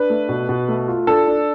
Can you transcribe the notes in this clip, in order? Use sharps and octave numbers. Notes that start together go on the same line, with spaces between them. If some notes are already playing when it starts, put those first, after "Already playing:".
Already playing: D4 B4
A3
B2
B2
A3
F4
D4 A4
D4